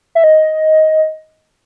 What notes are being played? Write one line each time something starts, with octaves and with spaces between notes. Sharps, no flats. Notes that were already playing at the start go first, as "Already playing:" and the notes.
E5
D#5